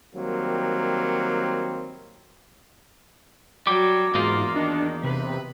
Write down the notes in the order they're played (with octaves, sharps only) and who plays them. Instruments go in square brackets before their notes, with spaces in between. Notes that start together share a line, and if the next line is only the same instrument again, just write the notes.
[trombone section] D#3 F#3 G3 A#3 C4
[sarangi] F#3 [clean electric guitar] G3 [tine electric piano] D6
[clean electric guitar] E2 A#3 D#4 [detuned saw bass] G#2 [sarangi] F4
[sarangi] D#3 [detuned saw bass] D4
[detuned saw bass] C3 [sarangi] B4